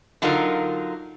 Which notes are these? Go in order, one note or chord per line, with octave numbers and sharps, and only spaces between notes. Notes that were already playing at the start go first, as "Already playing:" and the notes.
D3 F#3 D#4 F4 A#4